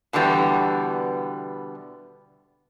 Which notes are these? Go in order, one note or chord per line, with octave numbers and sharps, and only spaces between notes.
B2 D3 E3 G3 B3